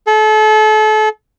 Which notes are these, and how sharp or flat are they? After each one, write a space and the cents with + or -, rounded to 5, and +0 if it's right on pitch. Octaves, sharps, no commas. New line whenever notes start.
A4 -35